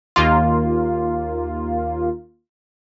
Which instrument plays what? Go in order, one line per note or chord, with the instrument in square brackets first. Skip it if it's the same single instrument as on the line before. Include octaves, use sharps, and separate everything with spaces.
[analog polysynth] D#2 A#3 F4